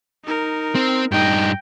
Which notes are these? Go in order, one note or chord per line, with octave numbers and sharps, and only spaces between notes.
D#4 A#4
C4
G2 D#4 G5 A#6